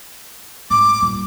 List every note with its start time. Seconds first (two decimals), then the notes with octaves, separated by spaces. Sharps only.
0.70 G#1 D6
1.02 D#1